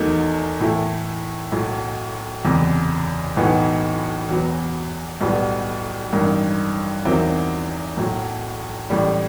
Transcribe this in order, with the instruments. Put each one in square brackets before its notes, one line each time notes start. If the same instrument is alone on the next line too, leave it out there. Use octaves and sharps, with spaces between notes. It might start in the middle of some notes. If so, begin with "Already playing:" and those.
Already playing: [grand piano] E2 D#3 F#3 A3 D#4
A2 E3 A3 E4
B1 A2 F#3
F#1 E2 C3
B1 A2 E3 B3 D#4
E2 B2 F#3 B3
B1 A2 G3 B3
A1 G2 D#3
E2 D#3 F#3 C4 E4
B1 A2 F#3
A1 A2 G3